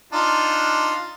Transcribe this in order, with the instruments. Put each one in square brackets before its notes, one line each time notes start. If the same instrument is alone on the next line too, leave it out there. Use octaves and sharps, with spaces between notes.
[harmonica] D4 D#4 F4